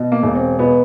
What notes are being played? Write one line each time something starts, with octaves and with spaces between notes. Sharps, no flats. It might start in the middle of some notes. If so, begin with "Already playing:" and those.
Already playing: B2
A#3
E1
C4
B2 B3